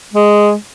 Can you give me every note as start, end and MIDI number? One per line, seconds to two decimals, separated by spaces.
0.14 0.55 56